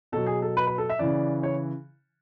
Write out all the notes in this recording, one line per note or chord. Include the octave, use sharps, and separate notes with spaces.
B2 F#3 A4
G#4
A4
B4
B4
A4
E5
C#3 E3 D5
C#5